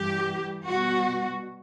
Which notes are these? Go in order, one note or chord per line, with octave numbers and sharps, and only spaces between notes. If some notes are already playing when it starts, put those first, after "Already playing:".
Already playing: G2 E3 G3 G4
B2 G3 F#4